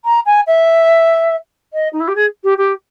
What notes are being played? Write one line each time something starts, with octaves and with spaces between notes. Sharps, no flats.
A#5
G#5
E5
D#5
D#4
E4
G4
G#4
G4
G4